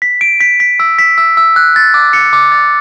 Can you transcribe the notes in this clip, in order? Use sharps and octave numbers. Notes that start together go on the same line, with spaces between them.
B6
D7
B6
B6
E6
B6
E6
E6
F#6
A6
D6
C#7
D6
A6